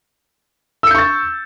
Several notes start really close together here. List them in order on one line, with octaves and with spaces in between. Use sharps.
E6 C#7 G6 C#6 A6